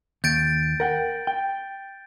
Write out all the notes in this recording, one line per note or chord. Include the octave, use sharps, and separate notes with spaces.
D#2 G6 A6 D7
A#4 F#5 G5
G5